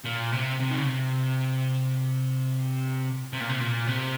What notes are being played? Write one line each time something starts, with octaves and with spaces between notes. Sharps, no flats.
A#2
C3
C3
D#3
C#3
C3
C3
A#2
C3
A#2
C3